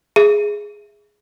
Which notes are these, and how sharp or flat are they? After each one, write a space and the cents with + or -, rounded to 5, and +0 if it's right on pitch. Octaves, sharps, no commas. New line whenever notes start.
G#4 +0 E5 +0